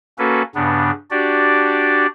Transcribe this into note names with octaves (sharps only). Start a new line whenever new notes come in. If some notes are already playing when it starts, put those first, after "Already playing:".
A#3 C#4 F#4 A4 B4
G2 C#3 B3 D4
D4 F#4 G4 D5